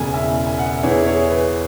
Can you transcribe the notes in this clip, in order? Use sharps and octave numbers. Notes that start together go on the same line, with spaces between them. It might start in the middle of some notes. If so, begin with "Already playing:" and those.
Already playing: E1 E2 C#3 G#5
E5 G#5
G#5
F#5
E5
E2 E3 B3 E4 G#4 C#5
G#4 C#5
B4